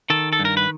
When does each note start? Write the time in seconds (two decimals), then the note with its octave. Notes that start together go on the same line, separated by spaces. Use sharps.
0.10 D#3 A4
0.33 A4
0.39 G2
0.45 A#4
0.57 B4